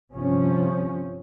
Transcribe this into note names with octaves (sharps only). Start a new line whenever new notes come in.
G1 C3 F3 C#4